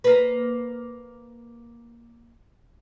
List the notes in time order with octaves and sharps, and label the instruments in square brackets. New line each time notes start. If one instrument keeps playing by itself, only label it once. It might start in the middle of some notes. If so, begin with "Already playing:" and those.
[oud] A#3 B4